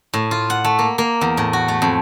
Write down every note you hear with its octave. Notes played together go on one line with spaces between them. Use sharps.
A2
F4
F#5
A3
A#3
A#3
E2
A2
F#4
A3
F2